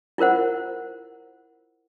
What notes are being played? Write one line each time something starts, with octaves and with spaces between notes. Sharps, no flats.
E4 F4 A#4 C5 F#5